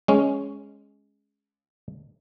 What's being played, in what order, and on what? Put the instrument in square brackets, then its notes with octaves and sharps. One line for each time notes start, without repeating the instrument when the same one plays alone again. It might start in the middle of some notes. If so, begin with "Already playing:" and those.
[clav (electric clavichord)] G#3 C#4